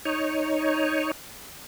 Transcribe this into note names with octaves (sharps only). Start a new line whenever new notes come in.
D#4 C#5